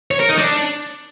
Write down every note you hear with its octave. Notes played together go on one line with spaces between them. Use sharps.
C#5
A#4
D#4
D4